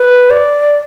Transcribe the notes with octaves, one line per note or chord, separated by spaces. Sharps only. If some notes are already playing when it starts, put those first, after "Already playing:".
Already playing: B4
D5